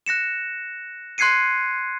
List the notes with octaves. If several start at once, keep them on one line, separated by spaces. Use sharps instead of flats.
F#6 A#6 C#7 E7
C6 F#6 G#6 C7 C#7 D#7